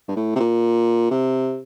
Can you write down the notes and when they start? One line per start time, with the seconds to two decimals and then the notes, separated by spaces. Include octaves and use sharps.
0.08 G2
0.16 A2
0.36 C3
0.40 A#2
1.11 C3